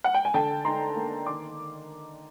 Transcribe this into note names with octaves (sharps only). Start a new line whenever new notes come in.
F#5
G5
G#5
D3 G5 A5
D#4 A#5 C6
A#3
D#3 C6 D6